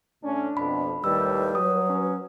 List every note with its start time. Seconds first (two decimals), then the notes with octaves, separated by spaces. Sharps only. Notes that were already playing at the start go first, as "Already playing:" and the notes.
0.24 A2 C#4 D4
0.57 F2 B2 B5
1.04 D#2 A2 D#3 G3 B4 E6
1.55 F#3 D#6
1.90 C#4